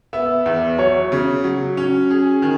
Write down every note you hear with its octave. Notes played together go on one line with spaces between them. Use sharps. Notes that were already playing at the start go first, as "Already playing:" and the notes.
B3 E5
E2
F#3 C#5
C#3
F#3
C#4
G#4
D#3